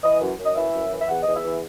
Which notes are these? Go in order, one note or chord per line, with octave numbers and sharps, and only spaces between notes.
E3 D#5
F#2
F#2
D#5
E3 E5
F#2
E3
E5
E2 F#5
E2 D#5
E5
E3